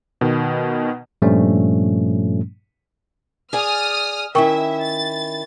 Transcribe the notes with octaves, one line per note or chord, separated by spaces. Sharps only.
B2 D#3
G2 A#2 F3 G3 A3 C#4
G#4 D5 G#5 D#6 F6
D#3 C#4 E4 A#4 E5 G5 C#6
A6